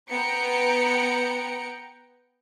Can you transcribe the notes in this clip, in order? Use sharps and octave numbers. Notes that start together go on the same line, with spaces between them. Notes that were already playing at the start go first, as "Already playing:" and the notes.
B3 G5 A#5 C#7 D7